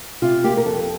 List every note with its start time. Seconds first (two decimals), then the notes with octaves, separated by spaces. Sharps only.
0.22 C3 F4
0.44 A#3 G4
0.57 A#4
0.65 F2 A4